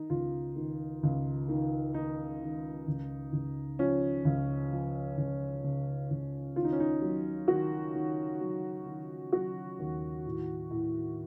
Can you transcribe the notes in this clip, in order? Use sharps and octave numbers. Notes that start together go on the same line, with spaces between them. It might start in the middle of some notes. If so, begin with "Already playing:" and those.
Already playing: D#3 D#4
C#2 F4
D#3
C#2
D#3
D#3 D#4
D#3
C#2
C#2
F3 C#4
C#2
F3
C#2
C#3
C#2
D#3 F4
D#4
C#4
D#4
F#3
D#3 F#4
D#3
F#3
D#3
F#3 F#4
D#2
A2
A2